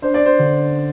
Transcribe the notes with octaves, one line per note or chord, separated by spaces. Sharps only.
D4 C5
D5
C5
D3